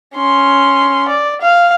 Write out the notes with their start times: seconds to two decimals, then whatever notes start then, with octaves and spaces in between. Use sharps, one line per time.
0.15 C#4 C6
1.08 D5
1.41 F5